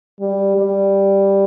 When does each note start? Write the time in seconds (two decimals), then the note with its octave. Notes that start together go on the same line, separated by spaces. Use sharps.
0.20 G3
0.57 G3